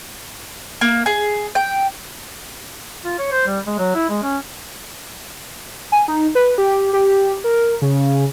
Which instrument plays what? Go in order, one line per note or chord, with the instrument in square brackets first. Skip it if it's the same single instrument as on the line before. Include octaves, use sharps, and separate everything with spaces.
[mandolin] A#3
G#4
G5
[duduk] F4
C#5
C5
G3
G#3
F#3
E4
G#3
C#4
[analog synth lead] G#5
D#4
B4
G4
G4
A#4
C#3